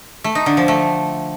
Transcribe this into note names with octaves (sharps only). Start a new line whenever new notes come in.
A3
D#4
D3
F3
A3